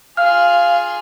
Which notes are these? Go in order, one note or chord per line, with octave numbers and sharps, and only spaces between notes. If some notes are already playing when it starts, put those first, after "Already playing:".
F4 G#4 F5 F6